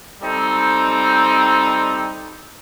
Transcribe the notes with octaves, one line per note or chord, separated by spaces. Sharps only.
G3 C4 D#4 A4